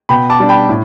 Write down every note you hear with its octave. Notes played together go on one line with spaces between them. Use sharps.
B2 G5 B5
A5 D6
G3 D4
G5 B5
A2